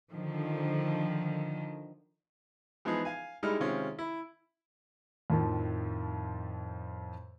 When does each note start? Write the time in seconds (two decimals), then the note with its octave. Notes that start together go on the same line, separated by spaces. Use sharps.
0.13 D3 D#3 F3
2.85 E3 F3 G#3 B3 D#4 G#4
3.05 F5 G#5
3.43 G3 G#3 D#4 E4 F6
3.60 C3 D#3 G#3 C4 C#4 F4
3.99 E4
5.30 F2 A2 D#3 F3